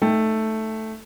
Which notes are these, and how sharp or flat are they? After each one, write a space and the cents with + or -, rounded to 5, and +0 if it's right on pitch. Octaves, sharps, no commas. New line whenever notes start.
A3 +0 D#4 +0 G5 +15